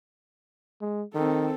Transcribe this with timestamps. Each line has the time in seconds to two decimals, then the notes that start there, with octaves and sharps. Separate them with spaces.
0.81 G#3
1.15 D#3 C4 A4